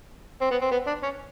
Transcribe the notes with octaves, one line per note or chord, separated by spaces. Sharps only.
C4
B3
C4
B3
D4
C#4